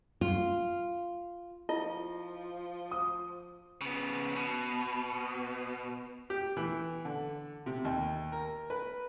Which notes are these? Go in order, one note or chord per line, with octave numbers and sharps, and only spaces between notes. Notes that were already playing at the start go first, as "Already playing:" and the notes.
F4
F3 E4 F4 D#5
D#6
C#3 B3
B2
G4
E3
D3
C3
D#2
A#4
B4